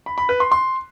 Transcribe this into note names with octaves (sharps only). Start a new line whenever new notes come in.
B5
B5
B4
C6
C6